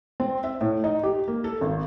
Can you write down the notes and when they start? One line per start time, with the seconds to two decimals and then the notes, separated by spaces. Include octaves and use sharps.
0.20 C4
0.44 E5
0.61 A2
0.84 D#4
1.03 G4
1.28 A#3
1.44 A4
1.61 G#1